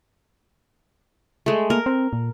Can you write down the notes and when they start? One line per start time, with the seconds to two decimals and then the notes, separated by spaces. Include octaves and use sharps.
1.46 G#3 A3
1.70 A#3 A#4
1.86 C4
2.13 A#2